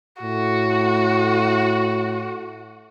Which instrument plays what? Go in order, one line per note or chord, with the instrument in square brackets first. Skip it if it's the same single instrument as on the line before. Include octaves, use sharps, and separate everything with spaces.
[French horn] A2 [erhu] F#4